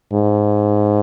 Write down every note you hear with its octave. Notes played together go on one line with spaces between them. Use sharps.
G#2